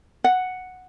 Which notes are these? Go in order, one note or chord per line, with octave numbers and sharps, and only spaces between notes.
F#5